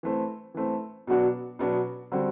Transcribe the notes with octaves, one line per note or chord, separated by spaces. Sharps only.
E3 A3 C4
E3 A3 C4
B2 F#3 B3 D4 F#4
B2 F#3 B3 D4 F#4
D3 G3 C4 F#4